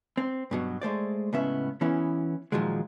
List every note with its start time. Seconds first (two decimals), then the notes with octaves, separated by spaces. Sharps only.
0.17 C4
0.51 G2 B2 F#3
0.82 G#3 A3 C5 D5
1.33 C#2 A2 B3 C#4 E5
1.81 E3 B3 C#4 E4
2.52 A#2 D#3 F3 F#3 G#3